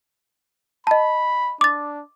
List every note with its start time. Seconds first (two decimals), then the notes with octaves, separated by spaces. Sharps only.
0.87 D#5 A5 B5
1.61 D4 D6 A6